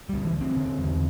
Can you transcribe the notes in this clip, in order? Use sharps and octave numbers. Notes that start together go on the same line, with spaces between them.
D2 G3
E3
D2 C4
D3
E2